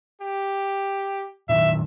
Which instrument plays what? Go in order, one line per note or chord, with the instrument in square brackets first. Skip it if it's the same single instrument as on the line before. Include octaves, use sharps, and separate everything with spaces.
[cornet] G4
[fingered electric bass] A#2 D#3 F#3 [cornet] E5